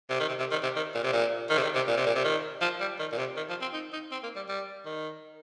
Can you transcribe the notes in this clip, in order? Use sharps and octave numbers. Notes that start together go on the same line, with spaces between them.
C3
D#3
C3
C3
D#3
C3
D#3
A#2
C3
A#2
D#3
C3
D#3
C3
A#2
C3
A#2
C3
D#3
F3
G3
D#3
A#2
C3
D#3
F3
C4
D#4
D#4
C4
A#3
G3
G3
D#3